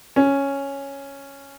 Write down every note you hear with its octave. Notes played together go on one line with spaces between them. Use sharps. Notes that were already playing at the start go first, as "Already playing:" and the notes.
C#4